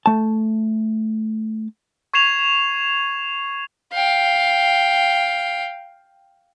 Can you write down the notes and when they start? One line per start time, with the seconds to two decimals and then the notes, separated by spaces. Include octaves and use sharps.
0.06 A3 A5
2.14 C#6 G#6 C7 E7 F7
3.93 F5 G5